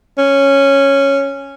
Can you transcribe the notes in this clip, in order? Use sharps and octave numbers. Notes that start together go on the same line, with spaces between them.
C#4